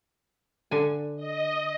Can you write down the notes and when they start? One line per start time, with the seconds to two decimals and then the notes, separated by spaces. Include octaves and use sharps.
0.71 D3 G#5
1.16 D#5